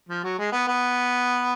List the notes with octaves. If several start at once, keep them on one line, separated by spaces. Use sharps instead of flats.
F3
F#3
G#3
B3
B3